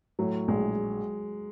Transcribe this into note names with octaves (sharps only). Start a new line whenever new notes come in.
A2 F#3
A#1 G#3